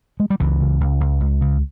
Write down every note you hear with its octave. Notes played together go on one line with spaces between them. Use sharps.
G#3
G3
C#2 E3
C#3
C#2
C#2
C#2
C#3